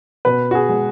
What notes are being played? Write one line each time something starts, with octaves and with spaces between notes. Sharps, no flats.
B2 B4
F#4
G#4
G#3